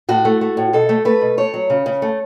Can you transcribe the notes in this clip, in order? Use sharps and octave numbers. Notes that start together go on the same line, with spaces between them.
A2 F#4
A3
A3
A2
B2 A4
A3
A3 B4
B2
A3 C#5
F#3
C#3
C#3
A3